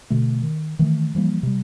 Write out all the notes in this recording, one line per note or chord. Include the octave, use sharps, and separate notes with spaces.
B2 D3 A3
D#3
D#3 E3 A3
E3 F3 G3 A#3
C3 G3